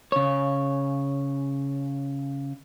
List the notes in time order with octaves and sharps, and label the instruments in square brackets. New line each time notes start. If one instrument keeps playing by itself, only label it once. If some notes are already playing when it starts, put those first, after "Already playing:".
[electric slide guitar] C#3 C#5